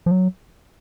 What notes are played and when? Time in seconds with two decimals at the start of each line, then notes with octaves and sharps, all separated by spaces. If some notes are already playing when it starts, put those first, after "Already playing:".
0.06 F3
0.11 F#3